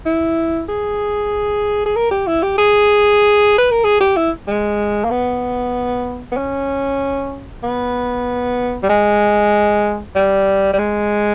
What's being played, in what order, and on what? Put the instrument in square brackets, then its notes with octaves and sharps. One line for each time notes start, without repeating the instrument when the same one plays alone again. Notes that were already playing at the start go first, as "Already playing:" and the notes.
[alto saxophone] E4
G#4
G#4
A#4
G4
E4
G4
G#4
B4
A#4
G#4
G4
E4
G#3
A#3
B3
B3
C#4
B3
G3
G#3
G3
G3
G#3